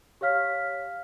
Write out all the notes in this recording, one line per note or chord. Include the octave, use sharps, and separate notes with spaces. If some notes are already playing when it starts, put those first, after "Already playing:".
G4 C#5 F5 F6 B6